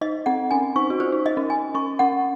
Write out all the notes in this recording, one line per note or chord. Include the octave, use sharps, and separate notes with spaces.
D#4 D#5
C4 F#5
C#4 G#5
D#4 C#6
F#4
F4 C5
D#4
D#4 D#5
C#4
G#5
C#4 C#6
C#4 F#5